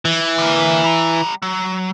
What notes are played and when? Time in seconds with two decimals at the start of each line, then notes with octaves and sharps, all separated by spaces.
0.05 E3
0.38 D3 A#3
0.84 G3 A#5
1.42 F#3